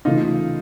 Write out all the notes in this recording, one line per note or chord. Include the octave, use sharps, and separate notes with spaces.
C#3 E3 A3 D#4 F4